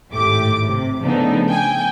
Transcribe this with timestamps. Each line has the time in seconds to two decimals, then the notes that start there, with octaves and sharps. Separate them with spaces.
0.12 G#1 A2 A3 G4 D6
0.66 C3
1.02 C#3 F3 A3 B3 D4 D#4
1.49 G5 G#5